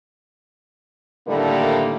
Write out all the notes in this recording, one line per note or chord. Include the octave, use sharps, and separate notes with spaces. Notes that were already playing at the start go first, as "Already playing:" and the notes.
A2 D3 D#3 G3 A3 A#3